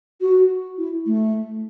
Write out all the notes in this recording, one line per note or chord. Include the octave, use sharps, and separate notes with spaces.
F#4
E4
A3